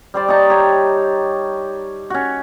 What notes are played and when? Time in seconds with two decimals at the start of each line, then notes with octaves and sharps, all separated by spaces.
0.14 G3 C5 D5
0.28 D#4 C#5 A5 A#5
0.50 G4 C#5
2.10 C#4 F#4